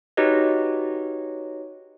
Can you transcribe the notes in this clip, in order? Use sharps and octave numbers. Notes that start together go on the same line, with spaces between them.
D#4 F#4 G4 B4 C#5 D#5